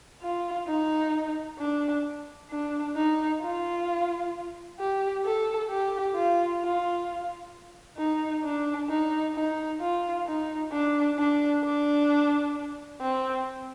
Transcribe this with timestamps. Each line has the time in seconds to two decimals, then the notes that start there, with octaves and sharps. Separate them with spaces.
0.22 F4
0.68 D#4
1.59 D4
2.51 D4
2.96 D#4
3.42 F4
4.79 G4
5.25 A4
5.69 G4
6.15 F4
6.61 F4
7.98 D#4
8.44 D4
8.89 D#4
9.35 D#4
9.81 F4
10.26 D#4
10.72 D4
11.18 D4
11.64 D4
13.01 C4